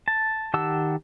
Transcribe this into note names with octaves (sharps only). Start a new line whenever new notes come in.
A5
D#3 G4 F#5 A5 E6